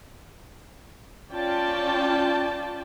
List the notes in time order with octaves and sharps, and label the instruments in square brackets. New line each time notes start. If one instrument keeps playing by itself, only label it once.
[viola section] C#4 F4 D5 G5 A5